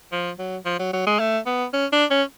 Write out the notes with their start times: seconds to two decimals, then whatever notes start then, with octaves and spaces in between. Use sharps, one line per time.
0.12 F3
0.39 F#3
0.65 F3
0.79 F#3
0.93 F#3
1.07 G#3
1.19 A3
1.46 B3
1.73 C#4
1.93 D4
2.10 C#4